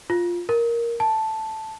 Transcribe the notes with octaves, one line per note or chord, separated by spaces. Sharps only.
F4
A#4
A5